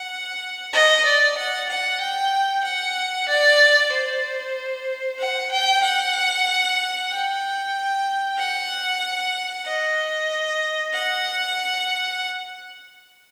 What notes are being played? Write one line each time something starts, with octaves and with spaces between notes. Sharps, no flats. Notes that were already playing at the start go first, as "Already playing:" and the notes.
Already playing: F#5
D#5
D5
F#5
F#5
G5
F#5
D5
C5
F#5
G5
F#5
G5
F#5
D#5
F#5